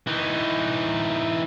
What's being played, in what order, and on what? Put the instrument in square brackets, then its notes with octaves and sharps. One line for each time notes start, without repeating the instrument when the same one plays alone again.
[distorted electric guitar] E3 D#4